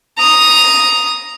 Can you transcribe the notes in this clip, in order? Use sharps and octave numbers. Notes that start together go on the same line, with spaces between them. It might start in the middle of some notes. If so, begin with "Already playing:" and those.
A#5 D#6